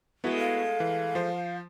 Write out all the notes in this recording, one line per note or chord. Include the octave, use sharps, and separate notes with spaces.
G#3 A3 B3 E4 F#4
F5
E3
F3 C5